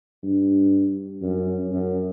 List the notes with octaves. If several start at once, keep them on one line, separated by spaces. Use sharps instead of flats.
G2
F#2
F#2